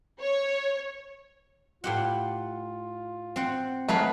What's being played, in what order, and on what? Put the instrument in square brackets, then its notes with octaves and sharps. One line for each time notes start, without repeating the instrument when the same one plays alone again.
[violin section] C#5
[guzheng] A2 G4 F#5 [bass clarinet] F4
[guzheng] C4 F#5
[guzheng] F#3 F5 B5 [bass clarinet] G#3 [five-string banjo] A3 B4